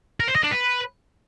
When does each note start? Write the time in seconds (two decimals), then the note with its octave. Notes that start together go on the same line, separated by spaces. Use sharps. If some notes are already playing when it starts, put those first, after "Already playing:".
0.20 A#4
0.28 C5
0.36 D#5
0.43 D4
0.51 B4